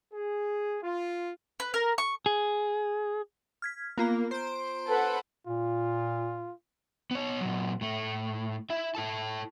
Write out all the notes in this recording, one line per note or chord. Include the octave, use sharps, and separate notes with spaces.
G#4
F4
B4
A#4
C#6
G#4
F6 G#6 B6
A#3 B3 F4 A#5
C5 D7
A4 B4 F#5
A#2 F4
B3 C#5
A#2 F#3
A2 A3
E4 E5
E4 A4 A5